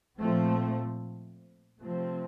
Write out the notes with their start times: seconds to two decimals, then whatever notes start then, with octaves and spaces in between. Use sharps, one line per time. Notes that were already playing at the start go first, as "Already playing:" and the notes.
0.17 A#2 F3 A3 C4
1.80 C3 F3 A3 C4